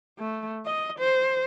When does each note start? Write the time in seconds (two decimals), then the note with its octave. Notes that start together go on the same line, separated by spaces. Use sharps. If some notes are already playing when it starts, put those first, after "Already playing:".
0.19 A3
0.65 D#5
0.99 C5